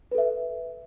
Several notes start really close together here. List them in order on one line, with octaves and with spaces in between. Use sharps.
B4 A4 E5